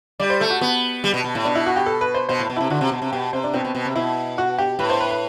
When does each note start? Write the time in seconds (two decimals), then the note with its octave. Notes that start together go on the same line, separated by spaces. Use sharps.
0.20 G3 D5
0.30 C5
0.40 A3 A4
0.50 F#4
0.61 B3 F#4
1.04 G3
1.14 B2
1.24 B2
1.35 A2
1.45 B2 D4
1.55 E4
1.66 F#4
1.76 G4
1.86 A4
2.01 B4
2.14 C5
2.29 B2 C5
2.39 A2
2.50 B2
2.56 C3 E4
2.70 D3 F#4
2.81 C3
2.92 B2
3.02 C3
3.12 B2 G4
3.33 C3 C5
3.44 D4
3.54 B2 C4
3.64 B2
3.75 B2
3.86 C3
3.95 B2 E4
4.38 F#4
4.58 G4
4.79 A2 B4
4.90 C5
5.00 B4
5.11 B4